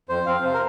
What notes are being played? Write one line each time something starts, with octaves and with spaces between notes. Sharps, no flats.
F2 C5
F3 C4 F5
C3 C5
A#4